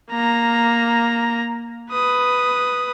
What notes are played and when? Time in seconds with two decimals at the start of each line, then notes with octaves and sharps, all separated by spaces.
0.11 A#3 A#5
1.92 B4 D#6